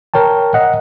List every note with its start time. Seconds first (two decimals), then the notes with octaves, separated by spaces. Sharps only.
0.14 A#4 C#5 G5 A5
0.54 D#5 F#5